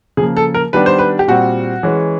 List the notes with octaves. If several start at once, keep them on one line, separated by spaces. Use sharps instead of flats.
C#3 F3 A#3 G#4
A4
A#4
D#3 G3 B3 D4 B4
C5
B4
G4
A#2 G3 C4 F#4
E3 G#3 C#4